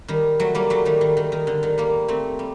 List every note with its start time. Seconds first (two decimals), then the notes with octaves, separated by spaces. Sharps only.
0.08 D#3 G3
0.40 F#3 A3
0.55 G3 A#3
0.70 F#3 A3
0.85 D#3 G3
1.01 D#3
1.17 D#3
1.32 D#3
1.47 D3
1.63 D#3
1.78 G3 A#3
2.08 A3 C4
2.39 G3